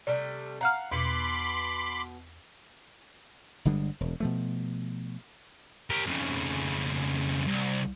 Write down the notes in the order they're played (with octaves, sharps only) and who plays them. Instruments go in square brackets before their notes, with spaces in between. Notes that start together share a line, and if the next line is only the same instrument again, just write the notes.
[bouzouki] C3 G3 A3 [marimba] D5
[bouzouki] F5 F#5 [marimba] A#5 F6
[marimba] E2 [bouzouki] B2 B3 [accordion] B5 C6 D6
[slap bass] G1 D3 G3 G#3
E1
B2 F3 A3
[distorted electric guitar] G4 A#4
F2 C#3
C2